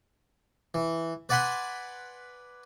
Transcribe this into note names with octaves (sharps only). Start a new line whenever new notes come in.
E3
B4 D5 F#5 G#5 B5 C6